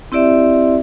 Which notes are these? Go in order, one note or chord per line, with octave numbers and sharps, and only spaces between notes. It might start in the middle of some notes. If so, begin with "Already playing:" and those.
C4 E4 G4 D5 E5 C6